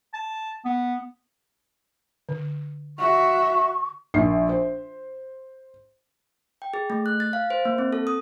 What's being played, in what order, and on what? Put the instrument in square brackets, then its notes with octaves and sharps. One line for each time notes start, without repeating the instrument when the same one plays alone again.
[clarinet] A5
B3
[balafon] D3
[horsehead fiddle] F#4 E5 [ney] C#6
[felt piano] A#1 C7
C5
[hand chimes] G5
G#4
A3
F#6
A6
F5
C5
A#3
C4
A4
D#6